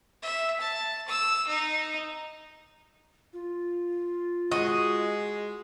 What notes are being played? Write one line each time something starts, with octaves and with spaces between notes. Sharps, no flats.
E5
A5
E6
D#4
F4
G#3 F#4 D#5